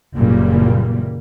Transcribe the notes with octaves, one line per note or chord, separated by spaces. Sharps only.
F#1 A#2 C#3 E3 G3 A#3